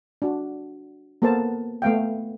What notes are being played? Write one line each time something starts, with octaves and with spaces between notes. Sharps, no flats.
D4 F#4
A#3 B3 A4 A#4 C5 A5
A3 B3 F5 G5